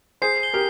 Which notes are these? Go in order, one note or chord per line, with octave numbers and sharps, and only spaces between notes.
G#4 C5 C7
G7
G4 A#4